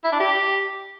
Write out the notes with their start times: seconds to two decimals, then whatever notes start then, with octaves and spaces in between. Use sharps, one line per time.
0.04 E4
0.12 D4
0.20 G4